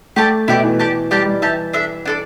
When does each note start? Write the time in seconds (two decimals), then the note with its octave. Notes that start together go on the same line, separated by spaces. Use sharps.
0.16 A3 G4 D5 A5
0.48 B2 E4 G4 D5
0.64 E3
0.79 G4 D5 A5
1.11 G3 D4 G4 D5 A5
1.26 G3
1.42 E3 G4 E5 A5
1.73 D4 A4 E5
2.06 D4 A4 D5